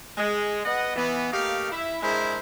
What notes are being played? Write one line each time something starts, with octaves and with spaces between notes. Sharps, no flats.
G#3
B3 D#5 F#5
E3 B3
A3 A#3 D#4 G4 F5
E4 E5
G#3 D4 E4 G#4 A#4 C5